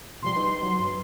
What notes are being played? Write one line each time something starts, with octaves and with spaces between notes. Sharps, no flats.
B2 F3 G3 C6
D#4 B4
F#3
G2 B4